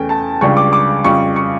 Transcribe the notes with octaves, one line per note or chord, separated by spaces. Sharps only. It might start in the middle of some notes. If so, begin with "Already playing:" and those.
Already playing: E2 E3 A3 C#4 G5
A5
C#2 C#3 G3 D4 C#6
D6
D6
F2 C#3 G3 C#6
C#6